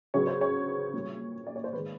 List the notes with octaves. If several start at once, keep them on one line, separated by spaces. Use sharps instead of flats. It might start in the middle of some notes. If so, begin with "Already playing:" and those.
C#3 F#3 B3 C#5
C5
C#5
A#2 G3 A#3
D5
C#5
C5
D#3 G#3 B3 B4